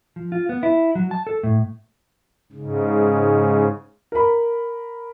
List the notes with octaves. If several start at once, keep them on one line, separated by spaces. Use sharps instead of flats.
F3
F4
B3
E4
F#3
A5
A4
A2
G#2 C#3
A#4 B5